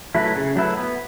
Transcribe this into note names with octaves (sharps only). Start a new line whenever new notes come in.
F#3 A3 E4 B4
C#3
F#3 A3 E4 B4
B3